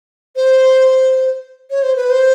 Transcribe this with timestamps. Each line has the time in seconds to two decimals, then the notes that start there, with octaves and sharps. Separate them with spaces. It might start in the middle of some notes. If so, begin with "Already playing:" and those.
0.36 C5
1.70 C#5
1.83 C5
1.96 B4
2.10 C5